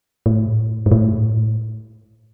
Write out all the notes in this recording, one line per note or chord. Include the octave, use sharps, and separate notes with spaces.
A2
G#2
A2